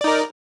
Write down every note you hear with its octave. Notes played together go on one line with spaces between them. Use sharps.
D#4 A#4 D5